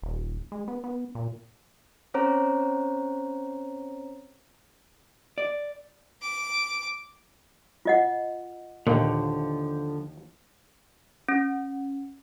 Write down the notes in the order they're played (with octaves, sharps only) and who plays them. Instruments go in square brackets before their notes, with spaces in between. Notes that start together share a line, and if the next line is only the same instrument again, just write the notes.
[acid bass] D#1
G#3
B3
B3
A#2
[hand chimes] C4 C#4 C5 C#5 A#5
[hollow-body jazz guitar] D5
[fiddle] D6
[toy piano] F4 D#5 F#5
[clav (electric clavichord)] D#2 [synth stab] A#2 [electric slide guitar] D3 F3
[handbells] C#4